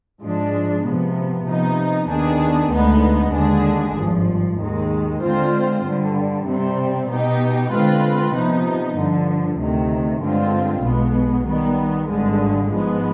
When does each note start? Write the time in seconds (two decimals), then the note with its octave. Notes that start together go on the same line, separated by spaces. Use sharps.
0.22 G#2 F3 G#3 D4
0.84 C3 F3 B3
1.46 C3 F3 B3 D#4
2.09 D#2 D#3 B3 D4 G#4
2.72 D2 D3 G#3 B3 D#4
3.34 D#2 D3 G#3 D4 G#4
3.96 G#1 G2 F3
4.59 D#2 D#3 G#3
5.21 D3 G#3 C4 F4 C5
5.84 G2 D3 G3
6.47 C3 G3 C4
7.09 B2 B3 D#4 G4
7.72 D3 G#3 C4 F4 B4
8.34 C3 F3 B3 D#4
8.96 G2 D3 F3
9.59 D2 C3 D#3
10.21 G2 D3 G#3 C4 F4
10.84 B1 B2 G#3 B3
11.47 D#3 G3 B3
12.09 G#1 G2 D3 G#3
12.71 G#2 F3 G#3 B3